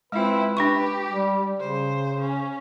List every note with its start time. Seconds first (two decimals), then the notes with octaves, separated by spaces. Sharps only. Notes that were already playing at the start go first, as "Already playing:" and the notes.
0.12 G#3 C4 E4 F4 B4
0.57 D4 G4 B5 C#6
1.10 G3
1.60 C#3 C5
2.21 C#4